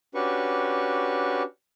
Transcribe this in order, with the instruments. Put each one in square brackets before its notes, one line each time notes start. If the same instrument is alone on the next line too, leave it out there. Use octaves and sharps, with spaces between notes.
[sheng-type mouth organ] C#4 D4 F#4 G4 B4 C#6